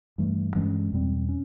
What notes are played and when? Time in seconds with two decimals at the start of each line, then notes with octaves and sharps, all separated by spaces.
0.18 G2 E3 A3
0.55 G2 E3 G#3 C#4
0.92 E2 B2 G3 C4
1.29 C#4